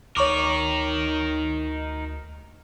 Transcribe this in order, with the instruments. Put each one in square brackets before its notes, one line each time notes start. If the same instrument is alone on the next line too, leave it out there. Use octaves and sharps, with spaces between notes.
[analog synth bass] D2 [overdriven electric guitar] D#4 A#4 [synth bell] C#5 C#6 D6